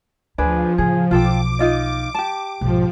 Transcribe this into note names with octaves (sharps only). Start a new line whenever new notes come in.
D2 F3 D4 G#4 B4
A2 C#3 G#4
B1 F4 A4 G5 D6
D#4 F4 D#5
G4 A5
B1 G#2 F3